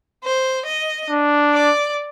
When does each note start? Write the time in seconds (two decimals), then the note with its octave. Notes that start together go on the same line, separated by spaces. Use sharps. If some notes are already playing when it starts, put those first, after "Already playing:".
0.24 C5
0.66 D#5
1.10 D4
1.53 D5